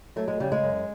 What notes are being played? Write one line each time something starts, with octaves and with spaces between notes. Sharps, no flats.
F#3 A3
G#3
C#3 G3
G#3
F#2